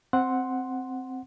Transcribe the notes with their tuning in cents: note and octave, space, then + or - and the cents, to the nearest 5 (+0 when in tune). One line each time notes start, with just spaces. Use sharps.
C4 +0 F#5 +0 C6 +0